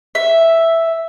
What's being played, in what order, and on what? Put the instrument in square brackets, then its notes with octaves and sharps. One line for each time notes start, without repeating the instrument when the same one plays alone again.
[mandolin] E5